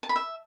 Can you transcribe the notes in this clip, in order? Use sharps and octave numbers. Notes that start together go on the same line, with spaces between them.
A5
B5
E5